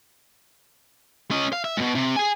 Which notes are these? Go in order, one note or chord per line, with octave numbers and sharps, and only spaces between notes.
C#4 D#5
F5
E5
G#2 B2
C3
G#4 G#5